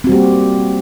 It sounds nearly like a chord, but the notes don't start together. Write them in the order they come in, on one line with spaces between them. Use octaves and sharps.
C4 F#4 G3 G4 A#3